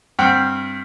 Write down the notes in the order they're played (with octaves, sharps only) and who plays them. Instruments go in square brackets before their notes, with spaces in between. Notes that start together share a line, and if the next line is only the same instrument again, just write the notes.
[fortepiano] G2 C4 F#5 G5 F6